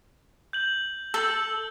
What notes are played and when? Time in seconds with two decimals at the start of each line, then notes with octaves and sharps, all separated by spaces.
0.53 G6 F#7
1.14 A4 E6 G6 G7